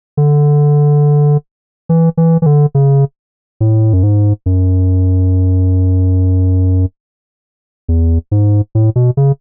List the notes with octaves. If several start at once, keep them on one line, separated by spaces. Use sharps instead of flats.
D3
E3
E3
E3
D3
C#3
A2
F#2
G#2
F#2
E2
G#2
A2
B2
C#3